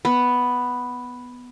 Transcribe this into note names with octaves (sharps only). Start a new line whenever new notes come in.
B3